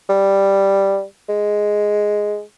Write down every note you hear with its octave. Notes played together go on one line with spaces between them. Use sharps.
G3
G#3